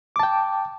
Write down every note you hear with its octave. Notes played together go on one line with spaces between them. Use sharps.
G5 A5 D6